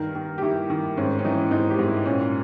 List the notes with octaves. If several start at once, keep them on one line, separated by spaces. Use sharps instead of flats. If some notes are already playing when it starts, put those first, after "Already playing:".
Already playing: G2 D#3 A#4
D#3
G4
D#3 E4
D#3
G#2 C#4
C#4
E3 D#4
G#2 D#4
G4
G#2
E4
A#2 C#4